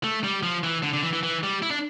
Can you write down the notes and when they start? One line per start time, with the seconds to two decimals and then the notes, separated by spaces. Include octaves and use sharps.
0.04 A3
0.24 G3
0.43 F3
0.63 E3
0.83 D3
0.93 D3
1.03 E3
1.13 E3
1.23 E3
1.43 G3
1.62 E4
1.71 D4